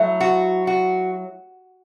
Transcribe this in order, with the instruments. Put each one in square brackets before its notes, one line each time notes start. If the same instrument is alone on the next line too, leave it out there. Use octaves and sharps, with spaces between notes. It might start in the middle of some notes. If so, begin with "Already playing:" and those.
Already playing: [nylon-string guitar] F#3 A3 E4
[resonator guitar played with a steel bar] F#4
F#4